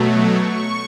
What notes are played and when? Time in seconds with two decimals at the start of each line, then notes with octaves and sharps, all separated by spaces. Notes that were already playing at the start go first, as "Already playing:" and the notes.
Already playing: B2 F#3 A3
0.28 C#6